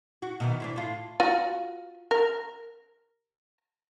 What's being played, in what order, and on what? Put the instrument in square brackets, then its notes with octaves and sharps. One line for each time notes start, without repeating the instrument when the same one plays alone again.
[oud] F#4
B2 D#3 E3
E3 C4 D4
A2 F4
[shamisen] F4 F#4
A#4